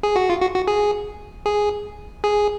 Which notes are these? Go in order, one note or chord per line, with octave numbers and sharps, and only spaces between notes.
G#4
F#4
F4
F#4
F#4
G#4
G#4
G#4